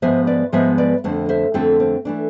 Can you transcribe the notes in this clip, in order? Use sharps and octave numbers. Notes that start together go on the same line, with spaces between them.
G#2 F3 G#3 B3 C5 E5
B4 D5
G#2 F3 G#3 B3 C5 E5
B4 D5
F2 D3 A3 C4
C5 E5
F2 D3 A3 C4 F4 A4
C4
E3 A3 D4